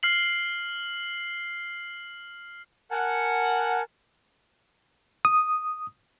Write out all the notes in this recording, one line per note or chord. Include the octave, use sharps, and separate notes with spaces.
F6 C7 F#7
A#4 F#5 G#5 A5
D#6